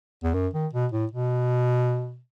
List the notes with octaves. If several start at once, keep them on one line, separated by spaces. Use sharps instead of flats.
E2
F#2
D#3
B2
A2
B2